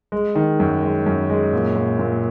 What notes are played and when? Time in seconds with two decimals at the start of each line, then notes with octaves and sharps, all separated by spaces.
0.12 G#3
0.35 D#3
0.60 F#2
0.82 G#3
1.06 F#2
1.30 G#3
1.53 A#2
1.76 A#2
1.99 A#2